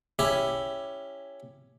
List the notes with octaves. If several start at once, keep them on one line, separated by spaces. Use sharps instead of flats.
C#4 E4 G4